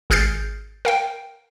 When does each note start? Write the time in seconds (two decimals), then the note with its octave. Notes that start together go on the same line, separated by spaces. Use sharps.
0.10 G#1 G#4 F6 G6 A6 C7
0.85 A#4 F5 G5